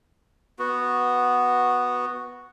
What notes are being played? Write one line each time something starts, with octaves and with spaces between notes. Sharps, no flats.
B3 F#4